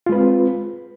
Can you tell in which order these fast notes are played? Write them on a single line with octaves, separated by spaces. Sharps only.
F4 G#3 B4 C4